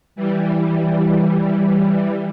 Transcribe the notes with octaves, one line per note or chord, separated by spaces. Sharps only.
E3 G3